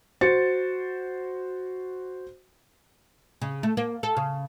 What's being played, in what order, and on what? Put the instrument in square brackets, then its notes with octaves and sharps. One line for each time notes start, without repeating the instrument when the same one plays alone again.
[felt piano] F#4 C5 A6 C#7
[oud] C#3
A3
A#3
A4
C#3